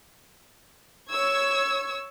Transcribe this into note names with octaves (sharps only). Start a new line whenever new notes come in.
C#5 C#6 E6 G#6